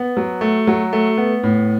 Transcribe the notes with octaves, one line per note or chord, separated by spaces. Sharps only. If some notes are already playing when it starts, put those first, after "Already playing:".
Already playing: B3
F#3
A3
F#3
A3
B3
A2